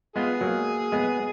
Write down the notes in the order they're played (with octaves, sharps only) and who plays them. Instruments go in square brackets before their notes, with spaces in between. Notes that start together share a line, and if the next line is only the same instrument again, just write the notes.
[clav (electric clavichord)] G#3 B3 [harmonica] F4 G#4
[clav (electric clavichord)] F#3 A#3
G#3 B3